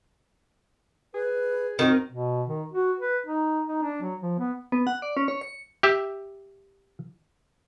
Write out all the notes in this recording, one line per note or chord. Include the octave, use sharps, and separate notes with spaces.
G#4 B4
D#3 C4 F#4 A#4
B2
D#3
F#4
B4
D#4
D#4
D4
F#3
F3
B3
B3
F#5
D5
C#4
C#5
C#7
G4 E5